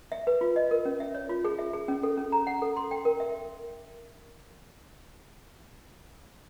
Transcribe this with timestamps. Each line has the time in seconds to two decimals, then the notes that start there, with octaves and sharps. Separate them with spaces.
0.12 E5
0.27 B4
0.41 F4
0.56 D#5
0.71 A#4
0.85 C#4
1.00 E5
1.15 C#5
1.29 F4
1.45 G#4
1.59 E5
1.73 G#4
1.88 C#4
2.03 A4
2.17 C#4
2.32 A#5
2.47 F#5
2.62 A4
2.77 C6
2.91 G5
3.05 A#4
3.20 E5